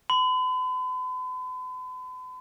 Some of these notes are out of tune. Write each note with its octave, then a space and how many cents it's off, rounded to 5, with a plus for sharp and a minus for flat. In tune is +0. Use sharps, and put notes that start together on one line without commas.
B5 +45